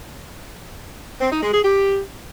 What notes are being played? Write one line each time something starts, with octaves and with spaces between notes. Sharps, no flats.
C4
D#4
G#3
G#4
G4